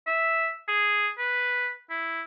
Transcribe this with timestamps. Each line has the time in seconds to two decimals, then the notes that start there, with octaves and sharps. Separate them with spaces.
0.07 E5
0.68 G#4
1.18 B4
1.90 E4